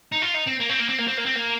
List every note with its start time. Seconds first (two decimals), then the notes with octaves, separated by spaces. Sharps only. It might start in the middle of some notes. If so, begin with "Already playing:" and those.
0.12 D#4
0.22 F4
0.34 D#4
0.47 C4
0.60 A#3
0.69 C4
0.79 A#3
0.89 C4
0.98 A#3
1.08 C4
1.17 A#3
1.26 C4
1.35 A#3